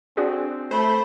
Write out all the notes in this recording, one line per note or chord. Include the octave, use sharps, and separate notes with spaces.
C4 D4 F#4 G#4
A3 C5 B5